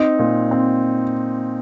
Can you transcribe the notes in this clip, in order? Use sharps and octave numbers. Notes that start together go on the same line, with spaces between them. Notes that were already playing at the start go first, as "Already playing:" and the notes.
Already playing: C4 D#4
A#2
C4